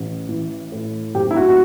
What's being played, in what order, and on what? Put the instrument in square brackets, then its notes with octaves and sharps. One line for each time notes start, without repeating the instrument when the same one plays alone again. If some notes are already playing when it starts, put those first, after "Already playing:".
Already playing: [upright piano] A1
E3
A2
F#1 G4
E4
F#4
F#4